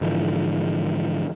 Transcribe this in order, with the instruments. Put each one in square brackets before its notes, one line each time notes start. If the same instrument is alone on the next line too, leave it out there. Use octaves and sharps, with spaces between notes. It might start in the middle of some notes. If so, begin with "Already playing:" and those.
[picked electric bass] G#2 D3 E3 F3